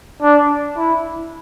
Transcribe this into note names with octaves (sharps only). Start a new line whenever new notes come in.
D4
E4